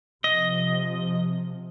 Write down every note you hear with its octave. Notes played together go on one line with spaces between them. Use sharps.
C3 F3 D#5